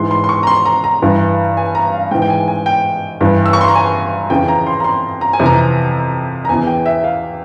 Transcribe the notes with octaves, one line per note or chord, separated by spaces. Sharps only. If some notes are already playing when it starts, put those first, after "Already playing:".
Already playing: G#2 E3 C6
C6
C6
C#6
A#5
C6
A#5
A#5
G2 E3
G#5
A#5
F5
G#2 E3 G5
G5
G#5
G#5
G5
G2 E3
E6
C#6
C6
A#5
G#5
F2 C#3 E3 G5
A#5
C6
A#5
C6
A#5
G#5
F2 C3 E3
A#5
A#5
E2 E3 G#5
G5
E5
F5